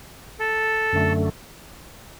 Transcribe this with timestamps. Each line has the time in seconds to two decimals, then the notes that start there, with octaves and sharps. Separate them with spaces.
0.39 A4
0.93 F#2 D3 A3